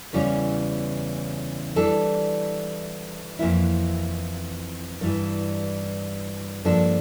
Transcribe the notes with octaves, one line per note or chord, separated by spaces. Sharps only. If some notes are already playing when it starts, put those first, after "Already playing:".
E2 C#3 E3 G3 C#4
E3 G3 D4 A4
F2 E3 A#3 E4
G2 E3 G3
G2 F3 A#3 D4 A4